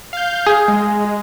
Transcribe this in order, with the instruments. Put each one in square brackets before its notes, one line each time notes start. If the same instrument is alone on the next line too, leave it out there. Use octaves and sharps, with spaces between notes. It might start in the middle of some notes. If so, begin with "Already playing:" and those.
[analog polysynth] F5 G6
[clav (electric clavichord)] G#4
[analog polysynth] G#3